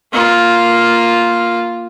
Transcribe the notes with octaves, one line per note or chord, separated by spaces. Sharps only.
A#3 F4